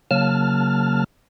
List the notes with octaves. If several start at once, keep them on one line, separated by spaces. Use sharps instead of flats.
C#3 F#3 A#3 A5 F6